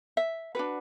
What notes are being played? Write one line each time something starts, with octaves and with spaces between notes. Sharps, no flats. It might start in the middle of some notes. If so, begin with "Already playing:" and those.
E5
D4 F#4 B4